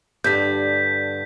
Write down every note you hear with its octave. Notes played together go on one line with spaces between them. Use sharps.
G2 D3 G6 B6